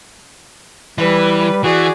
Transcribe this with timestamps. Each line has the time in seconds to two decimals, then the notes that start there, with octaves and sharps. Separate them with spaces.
0.98 E3 G3 B4
1.64 E3 F#4 G#4 D5